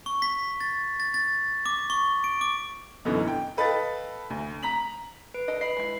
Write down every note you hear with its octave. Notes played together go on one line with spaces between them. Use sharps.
C#6
B6
A6
A6
A6
D6
C#6
D7
D6
F#2 B2 D3 E3 D#4
G5
A4 B4 D#5 F5 G5 A6
D2
A#5 B6 F#7
B4 D7
A4 A#4 D#5
B4 D#5 B5 C7
G#3 E4